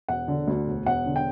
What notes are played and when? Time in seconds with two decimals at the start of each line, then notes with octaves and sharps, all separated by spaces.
0.08 E1 F#5
0.28 D3
0.48 D2
0.67 E1
0.86 E1 F#5
1.06 D3
1.16 G5